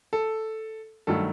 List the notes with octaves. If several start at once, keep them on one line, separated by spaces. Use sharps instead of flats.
A4
G2 D#3 F#3 A3 A4